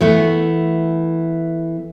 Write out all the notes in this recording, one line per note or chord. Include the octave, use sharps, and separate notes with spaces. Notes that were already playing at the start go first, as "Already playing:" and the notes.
E3 A3 B3